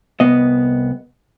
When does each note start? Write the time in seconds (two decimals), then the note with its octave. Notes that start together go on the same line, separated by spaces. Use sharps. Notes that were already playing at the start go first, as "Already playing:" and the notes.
0.20 C2 B3 D#5